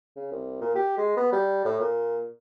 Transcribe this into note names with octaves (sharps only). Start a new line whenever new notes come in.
C#3
C2
A#2
G4
G#3
B3
G3
A2
A#2